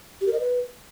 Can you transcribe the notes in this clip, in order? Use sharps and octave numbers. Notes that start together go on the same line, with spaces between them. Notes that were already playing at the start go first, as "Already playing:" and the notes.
G4
A#4
D#5
B4